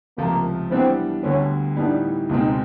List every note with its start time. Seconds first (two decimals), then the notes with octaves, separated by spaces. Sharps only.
0.18 C#2 C3 F3 A3 A#3
0.70 E3 G3 B3 C4 D4
1.23 D2 D3 G3 B3 C#4
1.76 A2 E3 G3 B3 D4 D#4
2.29 C#2 B2 G#3 C4 D#4